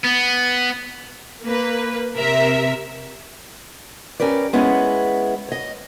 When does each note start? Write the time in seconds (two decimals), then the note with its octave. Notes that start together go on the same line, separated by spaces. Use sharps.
0.05 B3
1.45 A#3 B4
2.16 C3 A#4 E5
4.20 C#4 G4 A#4 B4 D5
4.53 G#3 B3 C#4 E4 G#4
5.49 C#5 D#5